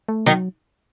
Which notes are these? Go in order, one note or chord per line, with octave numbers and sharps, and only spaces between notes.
A3
D#3 F#3 D#4